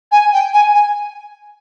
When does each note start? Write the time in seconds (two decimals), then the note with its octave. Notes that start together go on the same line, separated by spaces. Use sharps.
0.11 G#5
0.33 G5
0.53 G#5
0.74 G#5